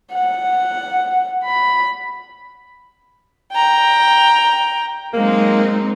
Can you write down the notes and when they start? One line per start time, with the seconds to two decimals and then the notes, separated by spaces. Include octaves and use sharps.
0.12 F#5
1.45 B5
3.53 G5 A#5
5.13 F#3 G#3 A#3 C4 D#4